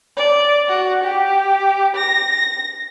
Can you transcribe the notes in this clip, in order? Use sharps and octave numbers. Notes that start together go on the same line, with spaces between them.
D5
F#4
G4
A#6